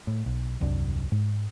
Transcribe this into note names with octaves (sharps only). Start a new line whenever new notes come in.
A2
B1
D#1 C2 F#2 D4
G#2